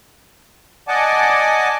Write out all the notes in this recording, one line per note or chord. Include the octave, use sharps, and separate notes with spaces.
D5 D#5 F#5 G#5 A5 D6